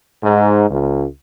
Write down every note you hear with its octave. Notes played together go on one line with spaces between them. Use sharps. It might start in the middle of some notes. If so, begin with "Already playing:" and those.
G#2
C#2